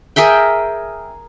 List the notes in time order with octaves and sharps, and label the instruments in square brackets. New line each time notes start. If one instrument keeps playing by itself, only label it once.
[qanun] G#4 A#4 E5 G5